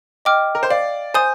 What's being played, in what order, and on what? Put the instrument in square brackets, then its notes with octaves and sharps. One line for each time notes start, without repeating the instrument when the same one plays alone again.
[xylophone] D#5 G5 D6 F6
[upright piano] A#4
C5
[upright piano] D5 [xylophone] F5
[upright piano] C5 [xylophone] G#5 D#6 G6